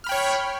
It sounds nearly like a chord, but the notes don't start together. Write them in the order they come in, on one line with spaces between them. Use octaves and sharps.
F6 B5 G5 C#5